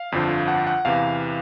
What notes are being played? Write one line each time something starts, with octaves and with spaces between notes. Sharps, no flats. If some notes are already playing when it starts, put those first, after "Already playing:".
Already playing: F5
G1 F2 D3 F3
F#5
F#5
E2 C3 E3 F5